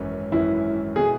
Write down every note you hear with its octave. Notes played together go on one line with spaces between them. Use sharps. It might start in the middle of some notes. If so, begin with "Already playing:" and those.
Already playing: G#1 F#2 E3 C#4
G#1 F#2 E3 C#4 E4
B2 B3 E4 G#4